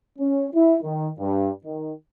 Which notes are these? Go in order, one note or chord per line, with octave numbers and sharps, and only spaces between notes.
C#4
E4
D#3
G2
D#3